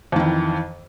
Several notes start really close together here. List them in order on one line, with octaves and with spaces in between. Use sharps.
F2 D#3 E3